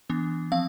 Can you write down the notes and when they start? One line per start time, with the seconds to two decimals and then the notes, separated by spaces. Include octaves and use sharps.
0.10 E3 B3 D4
0.52 F3 C4 F5